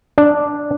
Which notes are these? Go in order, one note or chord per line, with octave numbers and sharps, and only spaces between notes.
D4